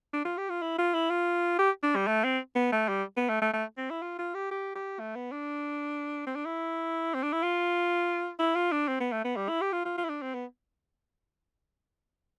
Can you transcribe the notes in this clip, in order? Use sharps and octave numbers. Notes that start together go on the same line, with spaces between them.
D4
F4
G4
F4
E4
F4
E4
F4
G4
D4
G3
A3
C4
B3
A3
G3
B3
A3
A3
A3
C4
E4
F4
F4
G4
G4
G4
A3
B3
D4
C4
D4
E4
C4
D4
E4
F4
E4
F4
D4
C4
B3
A3
B3
G3
E4
G4
F4
F4
F4
E4
D4
C4
B3